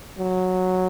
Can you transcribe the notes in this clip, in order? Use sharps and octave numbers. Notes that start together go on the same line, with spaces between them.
F#3